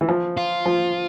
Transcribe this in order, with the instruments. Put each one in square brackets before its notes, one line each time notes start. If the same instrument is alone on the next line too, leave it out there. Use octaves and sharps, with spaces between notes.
[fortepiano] E3
F3
[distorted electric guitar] F4
[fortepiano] F3